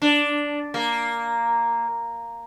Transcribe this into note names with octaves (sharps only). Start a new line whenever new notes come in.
D4
A#3